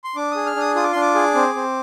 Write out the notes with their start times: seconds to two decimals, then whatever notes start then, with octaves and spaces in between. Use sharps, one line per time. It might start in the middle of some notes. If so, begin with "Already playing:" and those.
0.04 C6
0.16 D4 D6
0.31 G#4 D#6
0.46 F6
0.56 D4 D#6
0.75 F4 D#6
0.84 D6
0.92 D4 C6
1.01 D6
1.15 G#4
1.35 C4
1.55 C4